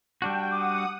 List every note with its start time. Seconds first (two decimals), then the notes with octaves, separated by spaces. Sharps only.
0.22 G3 D4 F#4 G5 A5
0.51 F#5 D6 D#6